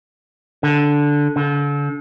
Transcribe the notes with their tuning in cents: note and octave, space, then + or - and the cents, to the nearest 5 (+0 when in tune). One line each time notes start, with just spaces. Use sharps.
D3 -5
D3 -35